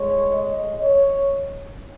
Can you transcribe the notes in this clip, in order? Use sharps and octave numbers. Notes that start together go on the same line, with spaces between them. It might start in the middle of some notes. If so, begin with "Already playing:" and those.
Already playing: A2 G#3 C#5
D#5
C#5